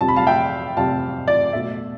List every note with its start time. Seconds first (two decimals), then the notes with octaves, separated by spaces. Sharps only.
0.01 F2 C3 G3 A5
0.08 B5
0.16 F5 A5
0.27 E5 G5
0.77 F2 C3 G3 F5 A5
1.28 D5
1.53 B2 A3 E5